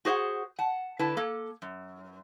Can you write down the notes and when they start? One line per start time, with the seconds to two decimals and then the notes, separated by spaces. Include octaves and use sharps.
0.05 F#4 G#4 C5 D#5 F#5
0.59 F#5 A5
0.99 D3 E4 B4 A5
1.17 A#3 A4
1.62 F#2